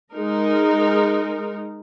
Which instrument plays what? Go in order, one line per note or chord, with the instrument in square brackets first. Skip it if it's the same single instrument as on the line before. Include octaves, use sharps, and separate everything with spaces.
[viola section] G#3 D#4 A#4